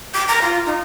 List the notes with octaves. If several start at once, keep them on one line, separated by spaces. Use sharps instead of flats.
D6
A#5
F4
D#4